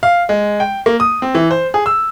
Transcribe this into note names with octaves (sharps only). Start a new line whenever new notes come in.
F5
G#3
G5
A#3
D#6
C4
E3
C5
G#4
E6